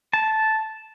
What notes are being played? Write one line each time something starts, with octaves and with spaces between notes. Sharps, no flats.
A5